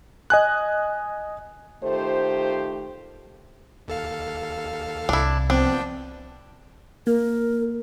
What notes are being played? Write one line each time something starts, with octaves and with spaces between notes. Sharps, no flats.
D#5 G#5 F#6
D#3 A3 F4 G4 C5
D#2 A4 F5
C2 D4 E4
F3 B3 C4 D4 G5
A#3 A#4